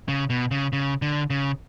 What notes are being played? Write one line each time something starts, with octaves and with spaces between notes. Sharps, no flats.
C#3
B2
C#3
C#3
D3
C#3